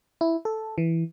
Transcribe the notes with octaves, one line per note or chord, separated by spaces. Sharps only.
E4
A4
E3